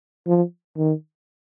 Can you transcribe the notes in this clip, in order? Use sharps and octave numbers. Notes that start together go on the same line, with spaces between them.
F3
D#3